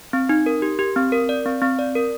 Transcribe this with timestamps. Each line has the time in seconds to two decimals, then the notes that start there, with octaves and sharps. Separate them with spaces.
0.13 C4
0.29 D#4
0.46 A#4
0.62 G4
0.79 G4
0.96 C4
1.12 A#4
1.29 D5
1.46 C4
1.62 C4
1.79 D5
1.95 A#4